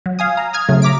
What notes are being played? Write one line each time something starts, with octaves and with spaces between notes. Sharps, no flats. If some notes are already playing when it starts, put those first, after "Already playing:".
F#3
F5 G#5 D#6
A#5
D#6 F6 G#6
C#3 F#3 A3
A#5 D6 B6 D7